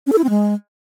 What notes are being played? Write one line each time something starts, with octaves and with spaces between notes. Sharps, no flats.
C#4
A4
E4
C4
G#3